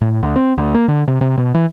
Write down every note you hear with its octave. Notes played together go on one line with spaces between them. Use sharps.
A2
D2
C4
D2
A#3
D3
C3
C3
B2
E3